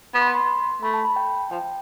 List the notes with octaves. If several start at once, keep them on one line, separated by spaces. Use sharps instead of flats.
B3
C6
B5
C6
A3 B5
A5
B5
G5
F3 G5